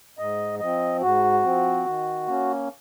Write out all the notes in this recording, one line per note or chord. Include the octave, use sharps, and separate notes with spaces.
G#2 D#5
F3 C4 D#5
G#2 F#4
F3 C4
D#3
A#3 C#4